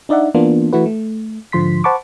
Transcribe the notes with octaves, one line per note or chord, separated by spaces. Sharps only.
D4 D#4 D5 E5 F#5
E3 A#3 B3 D4 F4
E3 A3 E4 F#4 B4
A3
G#2 D3 F3 C6 B6
C5 F#5 A5 B5 C#6 D6